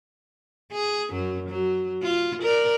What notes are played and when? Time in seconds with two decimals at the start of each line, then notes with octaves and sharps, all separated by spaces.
0.72 G#4
1.11 F#2 F#3
1.49 F#3
2.03 F4
2.43 A#4 D5